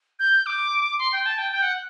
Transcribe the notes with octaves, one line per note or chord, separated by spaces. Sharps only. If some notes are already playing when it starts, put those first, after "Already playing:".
G6
D6
C6
G5
A5
G5
G5
F#5